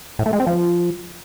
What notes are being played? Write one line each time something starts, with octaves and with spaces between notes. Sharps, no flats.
A2
A3
G#3
C4
F3